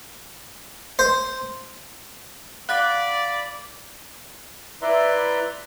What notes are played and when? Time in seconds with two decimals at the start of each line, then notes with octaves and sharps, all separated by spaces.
0.99 C5
2.69 D5 F5 F#5 B5 F#6 A6
4.82 E4 B4 D5 E5 A#5 C6